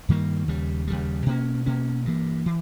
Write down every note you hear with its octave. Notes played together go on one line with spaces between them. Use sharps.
G2 D#3 G3 A#3
D#2 C#3 G3
D#2 C#3 G3
B2 A#3 C#4
B2 A#3 C#4
G2 E3 A#3
E3